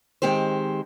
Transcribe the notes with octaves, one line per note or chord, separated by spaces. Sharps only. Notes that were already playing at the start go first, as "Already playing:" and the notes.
D#3 G#3 C4 G4 C5